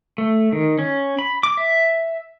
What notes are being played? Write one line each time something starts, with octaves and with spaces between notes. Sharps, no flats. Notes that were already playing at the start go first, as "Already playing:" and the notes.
A3
D#3
C#4
B5
D6
E5